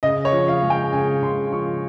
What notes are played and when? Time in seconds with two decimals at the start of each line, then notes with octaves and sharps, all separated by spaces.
0.03 C#3 D#5
0.25 C#5
0.32 F3
0.48 F5
0.62 G#3
0.70 G5
0.93 C#3 G#5
1.23 C#3 C6
1.53 F3 C#6